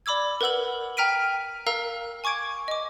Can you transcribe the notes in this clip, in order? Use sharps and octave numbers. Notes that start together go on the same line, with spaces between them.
D5 B5 D6 E6 G#6
A#4 B4 F#5 E6 F#7
G5 A#5 F6 B6 D7 D#7
A#4 F5 A#5 E6
G#5 C#6 D6 G#6 D7
D#5 D6